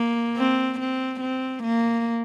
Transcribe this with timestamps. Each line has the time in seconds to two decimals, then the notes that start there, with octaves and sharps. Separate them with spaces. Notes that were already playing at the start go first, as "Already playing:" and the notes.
Already playing: A#3
0.37 C4
0.79 C4
1.20 C4
1.63 A#3